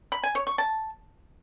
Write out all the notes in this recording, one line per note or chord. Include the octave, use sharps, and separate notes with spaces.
B5
G#5
C#5
C#6
A5